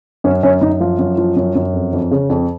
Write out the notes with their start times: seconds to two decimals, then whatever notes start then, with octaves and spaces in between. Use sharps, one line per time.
0.24 F#2 C#4
0.43 F#2 C#4
0.61 F#2 D#4
0.80 F3 F4
0.99 F#2
1.18 F3
1.36 F#2
1.55 F#2
1.73 F2
1.93 F2
2.11 C#3
2.30 F2